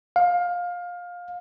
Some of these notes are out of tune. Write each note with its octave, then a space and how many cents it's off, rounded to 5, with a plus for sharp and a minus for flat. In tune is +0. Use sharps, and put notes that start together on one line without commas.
F5 +20